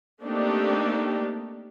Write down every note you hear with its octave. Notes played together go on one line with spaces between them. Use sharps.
A3 A#3 C4 D4 D#4 G4